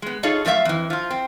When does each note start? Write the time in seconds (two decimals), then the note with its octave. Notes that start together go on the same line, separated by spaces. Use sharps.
0.02 G#3 B3
0.23 D#4 F4 G#4 A4 C#5 D#5
0.45 F#2 F3 A3 B3 E5 F5
0.65 F2 E3
0.90 F3 F4
1.10 C4